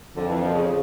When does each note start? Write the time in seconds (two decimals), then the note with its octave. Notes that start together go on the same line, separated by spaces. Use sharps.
0.16 F2 D3
0.28 E3
0.41 D3
0.48 A#2
0.53 C#3
0.65 C#3